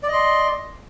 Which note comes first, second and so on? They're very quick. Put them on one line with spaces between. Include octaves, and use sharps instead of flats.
D5 D#5 C6